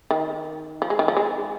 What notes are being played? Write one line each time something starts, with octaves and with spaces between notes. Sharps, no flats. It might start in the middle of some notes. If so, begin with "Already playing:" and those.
D#3
F3
G#3
D#3
F3
G#3